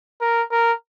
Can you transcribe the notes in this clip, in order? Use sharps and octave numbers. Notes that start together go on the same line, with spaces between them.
A#4
A#4